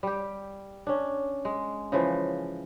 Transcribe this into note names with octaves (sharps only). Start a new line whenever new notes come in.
G3 G4
C#4 D4
G#3
C#3 E3 F3